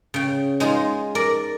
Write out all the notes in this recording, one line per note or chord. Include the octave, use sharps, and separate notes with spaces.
C#3 G5
G#3 D#4 F4 G#4
A#4 D5